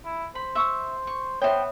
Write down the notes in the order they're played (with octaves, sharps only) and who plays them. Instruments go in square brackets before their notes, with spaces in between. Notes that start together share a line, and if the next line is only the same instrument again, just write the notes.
[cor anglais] E4
[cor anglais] C5 [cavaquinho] B5
[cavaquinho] E5 C#6
C#6
[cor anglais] B3 [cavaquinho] C5 G5 [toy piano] C#5 E5